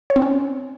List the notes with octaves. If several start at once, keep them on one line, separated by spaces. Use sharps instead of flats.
C#5
C4
C#4